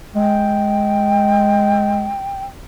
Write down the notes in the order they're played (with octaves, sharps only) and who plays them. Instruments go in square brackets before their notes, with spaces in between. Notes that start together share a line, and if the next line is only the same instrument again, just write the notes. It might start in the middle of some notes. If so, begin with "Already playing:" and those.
[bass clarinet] G#3 [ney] G5